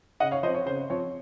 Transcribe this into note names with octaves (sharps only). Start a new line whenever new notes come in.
C#3 D#5 F#5
C#5 F5
F3 C4 C5 D#5
C#5
C#3 C5
F3 C4 C#5